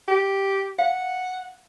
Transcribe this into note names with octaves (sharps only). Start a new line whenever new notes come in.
G4
F5 F#5